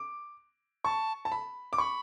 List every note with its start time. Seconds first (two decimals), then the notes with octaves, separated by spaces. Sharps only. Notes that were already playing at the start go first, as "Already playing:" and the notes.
Already playing: D6
0.85 A5 C#6
1.25 A5
1.32 B5
1.73 D6
1.78 B5 C#6